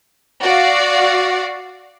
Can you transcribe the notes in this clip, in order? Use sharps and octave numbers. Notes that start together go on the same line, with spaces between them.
F#4 D5 F5